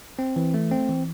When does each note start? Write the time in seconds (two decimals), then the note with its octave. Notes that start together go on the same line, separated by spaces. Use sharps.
0.19 C4
0.36 E3
0.54 A3
0.71 C4
0.89 E3